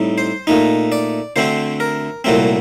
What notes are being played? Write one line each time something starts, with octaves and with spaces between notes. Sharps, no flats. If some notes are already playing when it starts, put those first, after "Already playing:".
Already playing: A2 G3 C4 D#4
C5
A#2 A3 D#4
D5
D2 D3 A3 C4 C5
A#4
C2 A#2 F#3 A3 C4